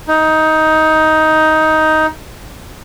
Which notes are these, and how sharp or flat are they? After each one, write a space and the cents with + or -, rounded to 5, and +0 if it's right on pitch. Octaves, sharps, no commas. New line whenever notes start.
D#4 +10